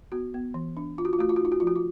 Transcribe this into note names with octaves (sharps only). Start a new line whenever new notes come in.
B3 F#4
B3
E3
D4
F4
F#4
F4
A3 F#4
F4
F#4
D#4 F4
F#4
F3 F4
F#4
F4